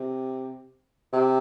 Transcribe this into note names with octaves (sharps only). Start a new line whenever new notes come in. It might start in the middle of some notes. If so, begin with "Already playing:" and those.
Already playing: C3
C3